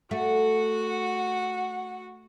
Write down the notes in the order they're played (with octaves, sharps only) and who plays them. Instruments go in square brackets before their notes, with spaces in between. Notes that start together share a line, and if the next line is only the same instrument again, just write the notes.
[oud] A3 [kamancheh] F#4 F#5